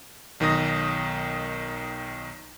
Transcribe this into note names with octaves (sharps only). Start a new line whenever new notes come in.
B1 D#3 D#4 D#6 A#6